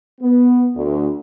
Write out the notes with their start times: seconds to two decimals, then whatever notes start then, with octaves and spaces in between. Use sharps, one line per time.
0.21 B3
0.75 D2